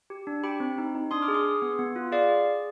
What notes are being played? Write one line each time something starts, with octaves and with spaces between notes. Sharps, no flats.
G4
D4
G4 G5 B5
C4
D#4
D#4
D4 C6 D#6
D6 F6
G#4
C6 D#6
G#4
B3
B3
F4
G#4 D5 F5
G#4
G#4